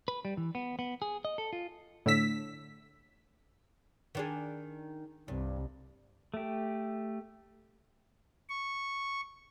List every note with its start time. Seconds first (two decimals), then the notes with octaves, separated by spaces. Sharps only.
0.08 B4
0.25 G3
0.37 E3
0.55 B3
0.79 B3
1.02 G#4
1.25 D#5
1.38 A4
1.53 F4
2.06 A2 D3 E6 B6
4.15 D#3 D4 G#4
5.28 C2 G2
6.34 A3 G4
8.49 C#6